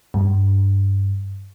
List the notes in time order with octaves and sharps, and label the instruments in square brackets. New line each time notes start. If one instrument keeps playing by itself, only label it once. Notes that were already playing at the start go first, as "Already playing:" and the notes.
[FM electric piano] G2